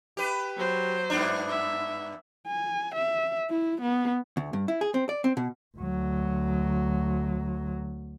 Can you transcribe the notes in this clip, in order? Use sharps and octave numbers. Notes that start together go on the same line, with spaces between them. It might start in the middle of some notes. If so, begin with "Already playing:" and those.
G4 B4
F#3 C5
G2 B3 D4
E5
G#5
E5
E4
B3
D2
G2
E4
G#4
C4
D5
C4
B2
D2 F#3